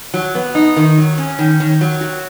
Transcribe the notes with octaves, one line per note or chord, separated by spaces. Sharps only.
F#3
B3
D#4
D#3
F#3
C#4
D#3
D#3
F#3
F#4